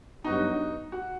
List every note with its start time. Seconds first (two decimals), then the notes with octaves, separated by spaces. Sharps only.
0.24 G2 F#3 B3 D#4 F#4
0.92 F#4